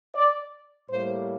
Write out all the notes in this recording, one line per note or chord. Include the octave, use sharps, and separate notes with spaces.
D5
A2 G3 A#3 C5